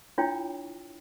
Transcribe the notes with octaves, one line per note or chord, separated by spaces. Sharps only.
D4 E4 F4 C#5 G5